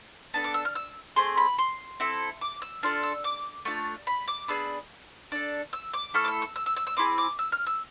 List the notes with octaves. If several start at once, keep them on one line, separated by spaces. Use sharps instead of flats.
B3 D4 A4 A5
D6
E6
F6
E6
A3 C4 G#4 C6
B5
C6
C4 E4 A4
D6
E6
D4 F4 A4 F6
E6
D6
A3 D4 F4
B5
D6
B3 D4 G#4 E6
D4 A4
E6
D6
A3 E4 A4 F6
D6
E6
E6
E6
E6
E6
E6
C4 E4 G#4 D6
D6
E6
F6
E6